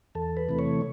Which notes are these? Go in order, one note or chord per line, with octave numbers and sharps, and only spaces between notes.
E2 A4
B4
C3 E3 A3
C#5